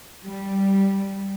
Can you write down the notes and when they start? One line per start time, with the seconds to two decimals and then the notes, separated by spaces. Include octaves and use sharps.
0.25 G3